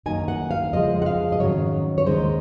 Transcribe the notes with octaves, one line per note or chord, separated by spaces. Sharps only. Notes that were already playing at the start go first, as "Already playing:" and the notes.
F#2 D#3 A#3 D#4 G#5
F#5
F5
F2 C#3 F3 G#3 D#5
F#5
F5
D#5
G#2 D#3 F#3 C#4 C#5
C#5
D#2 D#3 G#3 C5